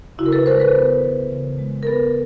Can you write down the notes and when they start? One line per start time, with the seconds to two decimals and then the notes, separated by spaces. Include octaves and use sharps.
0.18 C#3 E4 F#4
0.26 A#4
0.32 A4 B4
0.46 G#3 A#4 C5
0.60 A4 B4
0.75 B3
1.03 E3
1.31 C#3
1.59 G#3
1.83 A#4
1.87 B3 A4 B4